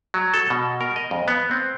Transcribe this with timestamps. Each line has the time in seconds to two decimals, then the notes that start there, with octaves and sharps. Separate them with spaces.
0.14 F#3
0.34 A4
0.50 B2
0.81 A#4
0.96 D#5
1.11 F2
1.28 B3
1.51 C4